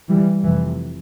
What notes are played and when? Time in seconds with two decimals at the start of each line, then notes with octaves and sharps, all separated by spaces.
0.09 E3 G3
0.42 F1 F2 C3 E3